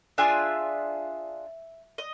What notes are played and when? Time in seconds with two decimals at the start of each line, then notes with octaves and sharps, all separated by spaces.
0.18 D4 F4 G#4 E5
1.98 D#5